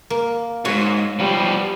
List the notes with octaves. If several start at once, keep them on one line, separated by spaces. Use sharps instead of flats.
A#3
E2 G#2 F#4 C#5
F3 G3 B3